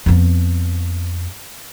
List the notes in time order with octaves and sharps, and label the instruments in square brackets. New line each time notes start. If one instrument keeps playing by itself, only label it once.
[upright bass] F2 B3